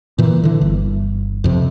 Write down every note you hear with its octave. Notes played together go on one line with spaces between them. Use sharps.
A#2 E3
D3 E3
G1
F2 C3